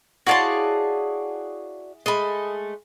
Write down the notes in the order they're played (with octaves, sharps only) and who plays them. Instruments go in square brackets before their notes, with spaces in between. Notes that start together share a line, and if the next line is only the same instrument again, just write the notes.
[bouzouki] E4 G#4 [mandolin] F#4 D5 A5 [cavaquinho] C#5 F5 C6
[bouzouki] G#3 A3 G#5 [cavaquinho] D#5 B5